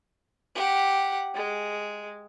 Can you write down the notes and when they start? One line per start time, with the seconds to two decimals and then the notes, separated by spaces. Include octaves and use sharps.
0.55 G4 F#5
1.34 G#3